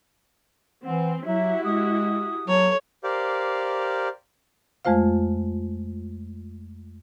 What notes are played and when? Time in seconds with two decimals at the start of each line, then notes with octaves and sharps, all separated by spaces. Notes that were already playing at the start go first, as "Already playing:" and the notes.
0.86 E3 C4 F#5
1.27 F#3 E4 F#4 G4 E5
1.65 G#3 D#6
2.48 F#3 A4 C#5
3.04 G4 A#4 C5 D5 F5
4.85 F2 G#3 A3 F4 C5 F5